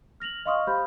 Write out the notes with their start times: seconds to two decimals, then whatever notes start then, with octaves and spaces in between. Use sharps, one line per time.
0.20 F6 A#6 F7 F#7
0.46 D#5 F5 C6 C#6 D#6 F6
0.67 G4 C5 F5 B5 G6